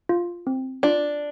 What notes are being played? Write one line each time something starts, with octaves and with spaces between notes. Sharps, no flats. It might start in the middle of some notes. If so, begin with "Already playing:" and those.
F4
C4
D4 F4